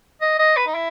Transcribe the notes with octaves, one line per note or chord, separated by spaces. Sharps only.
D#5
D#5
B4
D#4
E4